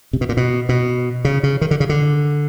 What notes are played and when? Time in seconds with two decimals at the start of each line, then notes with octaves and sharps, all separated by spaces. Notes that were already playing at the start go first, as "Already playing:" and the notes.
0.13 C3
0.21 B2
0.29 A#2
0.37 B2
0.69 B2
1.25 C#3
1.43 C#3
1.61 D#3
1.71 D3
1.80 C#3
1.89 D3